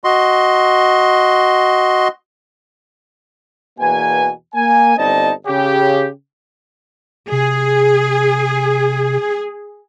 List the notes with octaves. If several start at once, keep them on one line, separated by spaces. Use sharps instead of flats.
F#4 D#5 C6
E2 B2 A#3 B4 G#5
A#3 G#5
G1 C4 D4 D#4 D#5 A5
C#3 G4
C3 G#4